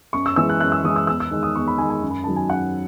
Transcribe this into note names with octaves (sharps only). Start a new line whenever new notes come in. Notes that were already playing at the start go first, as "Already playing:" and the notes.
F#2 C#6
E6
E3 G#3 E6
F#6
F#2 F#6
E6
E3 G#3 D#6
E6
E2 E6
E6
D#3 G#3
D#6
E2 C#6
B5
D#3 G#3 G#5
G#5
F#2
B5
D#3 F#3 A5
G#5
F#2 F#5